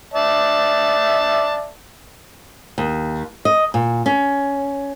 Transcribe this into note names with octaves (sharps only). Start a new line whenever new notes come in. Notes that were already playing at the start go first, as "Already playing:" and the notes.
D5 E5 A5
D#2
D#5
A#2
C#4